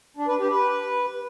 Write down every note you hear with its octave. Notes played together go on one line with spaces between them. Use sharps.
D4
B4
G4
B4